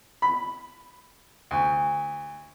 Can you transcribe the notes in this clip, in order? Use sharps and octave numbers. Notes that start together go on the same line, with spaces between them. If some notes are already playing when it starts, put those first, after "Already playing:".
B5
D2